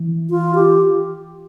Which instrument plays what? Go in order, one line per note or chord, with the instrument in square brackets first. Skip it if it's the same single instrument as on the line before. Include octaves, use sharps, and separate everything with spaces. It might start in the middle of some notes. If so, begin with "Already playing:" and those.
Already playing: [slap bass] E3
[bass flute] F4
G4